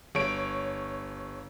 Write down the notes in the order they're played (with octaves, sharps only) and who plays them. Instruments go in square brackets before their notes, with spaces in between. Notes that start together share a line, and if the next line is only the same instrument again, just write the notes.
[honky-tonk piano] G1 C#5 D7